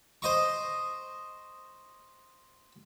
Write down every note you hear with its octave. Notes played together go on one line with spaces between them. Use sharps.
C5 D#5 C#6